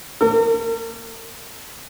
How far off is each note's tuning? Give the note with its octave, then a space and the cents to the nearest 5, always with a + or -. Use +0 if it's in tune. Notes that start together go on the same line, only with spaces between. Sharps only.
A#3 -20 A#4 -45